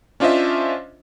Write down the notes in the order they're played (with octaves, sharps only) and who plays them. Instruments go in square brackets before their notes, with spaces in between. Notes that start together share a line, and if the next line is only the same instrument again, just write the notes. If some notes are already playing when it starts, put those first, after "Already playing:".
[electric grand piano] C#4 D4 F4 C5 D#5 E5